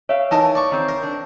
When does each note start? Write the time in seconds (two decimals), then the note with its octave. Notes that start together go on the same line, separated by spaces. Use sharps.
0.09 C#5 E5 F5
0.31 E3 D#4 A#4 A5
0.55 D5 C#6 D6
0.71 D#3 C4 C5
0.89 A#4
1.03 D4